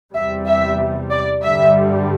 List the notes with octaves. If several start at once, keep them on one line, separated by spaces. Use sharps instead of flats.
E2 C3 G3 E5
E5
D5
G2 D3 G3 E5